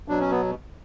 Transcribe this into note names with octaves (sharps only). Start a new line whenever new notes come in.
B2 F#3 D4
C#4
B3